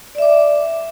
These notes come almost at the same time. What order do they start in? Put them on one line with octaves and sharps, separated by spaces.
D5 E5 D6